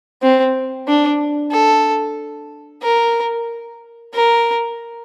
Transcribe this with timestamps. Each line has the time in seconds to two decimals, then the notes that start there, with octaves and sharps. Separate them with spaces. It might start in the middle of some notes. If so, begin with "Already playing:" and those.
0.22 C4
0.87 D4
1.52 A4
2.82 A#4
4.14 A#4